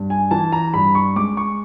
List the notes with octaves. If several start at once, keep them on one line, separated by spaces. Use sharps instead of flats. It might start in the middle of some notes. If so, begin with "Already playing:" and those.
Already playing: G2
G#5
E3 A5
A#5
G2 B5
C#6
G#3 D6
C#6